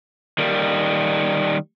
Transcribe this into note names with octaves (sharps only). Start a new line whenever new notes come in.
D#3 G3 A#3